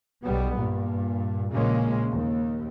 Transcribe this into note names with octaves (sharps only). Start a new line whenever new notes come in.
B1 G3 B3
G2 A#2
A#1 A#2 C#3 G#3 A#3 C#4
D#2